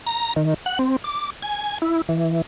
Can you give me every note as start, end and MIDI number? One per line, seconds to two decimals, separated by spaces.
0.07 0.33 82
0.36 0.54 51
0.66 0.79 78
0.79 0.96 60
1.04 1.30 86
1.42 1.78 80
1.82 2.02 64
2.09 2.42 52